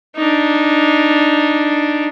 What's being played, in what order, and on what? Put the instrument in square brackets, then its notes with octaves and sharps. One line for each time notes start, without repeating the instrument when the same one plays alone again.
[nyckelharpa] D4 D#4